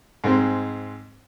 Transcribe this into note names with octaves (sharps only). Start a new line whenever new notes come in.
G#2 G#3 C4